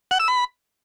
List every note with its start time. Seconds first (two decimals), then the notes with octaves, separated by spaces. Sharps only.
0.11 F#5
0.20 E6
0.28 B5